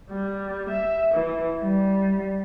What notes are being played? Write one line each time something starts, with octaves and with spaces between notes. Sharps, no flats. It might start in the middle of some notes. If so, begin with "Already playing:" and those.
G3
E5
E3
G3